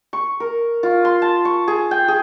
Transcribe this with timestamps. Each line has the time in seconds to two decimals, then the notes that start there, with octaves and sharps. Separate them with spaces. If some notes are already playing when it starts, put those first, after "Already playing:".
0.13 C#6
0.40 A#4
0.83 F4
1.05 C6
1.22 A5
1.45 C#6
1.68 G#4
1.91 G5
2.08 G#4